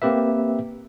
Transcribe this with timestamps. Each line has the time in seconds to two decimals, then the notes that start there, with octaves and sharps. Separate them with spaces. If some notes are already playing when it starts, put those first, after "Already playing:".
0.02 A#3 C4 G4 B4 E5